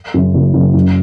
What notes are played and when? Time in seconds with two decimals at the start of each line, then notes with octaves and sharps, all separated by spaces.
0.14 F#2 C#3
0.34 F#1
0.54 F#2 C#3
0.74 F#2